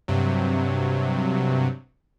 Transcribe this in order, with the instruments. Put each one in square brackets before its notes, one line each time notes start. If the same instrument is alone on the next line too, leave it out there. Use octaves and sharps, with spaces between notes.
[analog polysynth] G2 C3 F#3